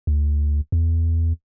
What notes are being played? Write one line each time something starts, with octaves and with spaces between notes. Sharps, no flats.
D2
E2